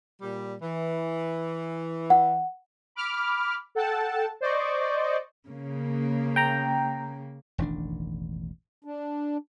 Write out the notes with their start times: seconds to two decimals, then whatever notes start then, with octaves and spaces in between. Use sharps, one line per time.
0.22 A#2 G3
0.62 E3
2.10 F#5
2.95 B5 D6 F6
3.75 A4 F#5 G5 A5
4.41 C5 D5 D#5 C#6
5.47 C#3 A#3
6.36 G5 A#5
7.58 E1 A1 D#3 D4
8.84 D4